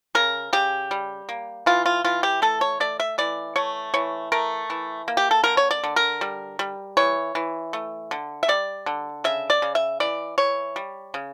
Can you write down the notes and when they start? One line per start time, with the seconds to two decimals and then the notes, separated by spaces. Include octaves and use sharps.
0.15 C#3 A#4
0.53 C#3 G4
0.91 G3
1.29 A#3
1.66 E3 F4
1.86 F4
2.04 E3 F4
2.23 G4
2.42 A3 A4
2.61 C#5
2.80 A3 D5
3.00 E5
3.18 E3 D5
3.56 A3 C#5
3.94 E3 C#5
4.32 A3 A#4
4.70 E3
5.08 A#3
5.17 G4
5.31 A4
5.44 D3 A#4
5.57 C#5
5.71 D5
5.84 D3
5.96 A#4
6.21 G3
6.59 G3
6.97 E3 C#5
7.35 E3
7.73 A3
8.11 D3
8.43 E5
8.48 G3 D5
8.86 D3
9.24 C#3 E5
9.50 D5
9.62 C#3
9.75 E5
10.00 E3 D5
10.38 E3 C#5
10.76 G3
11.14 C#3